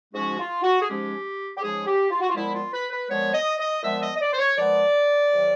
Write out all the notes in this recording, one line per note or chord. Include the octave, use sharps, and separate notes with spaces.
G#2 F3 G#3 C#4 F#4
F4
F#4
G#4
G#2 F3 G#3 C#4 G4
G4
G#2 F3 G#3 C#4 G#4
G4
F4
F#4
F4
A#2 F3 G#3 B3 E4
F4
B4
B4
A#2 F3 G#3 B3 C#5
D#5
D#5
A#2 F3 G#3 B3 E5
D#5
D#5
D5
C5
C#5
A#2 F3 G#3 B3 D5
C3 D#3 F#3